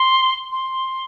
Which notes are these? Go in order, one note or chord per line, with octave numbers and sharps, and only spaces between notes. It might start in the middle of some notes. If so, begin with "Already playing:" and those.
Already playing: C6
C6